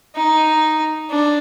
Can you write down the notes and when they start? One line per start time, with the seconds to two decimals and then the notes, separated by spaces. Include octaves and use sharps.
0.15 D#4
1.10 D4